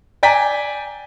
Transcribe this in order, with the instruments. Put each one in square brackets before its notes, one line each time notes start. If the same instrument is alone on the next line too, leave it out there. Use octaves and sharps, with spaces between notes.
[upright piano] D5 G5 G#5 A#5 B6